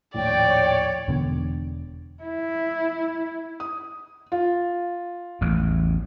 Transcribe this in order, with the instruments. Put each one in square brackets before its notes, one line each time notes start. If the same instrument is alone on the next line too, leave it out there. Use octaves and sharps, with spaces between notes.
[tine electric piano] A#1 D#2 A2 [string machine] C#5 [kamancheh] D5 [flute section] G5
[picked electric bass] E1 B2 D3
[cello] E4
[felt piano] D#6
F4
[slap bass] A1 E2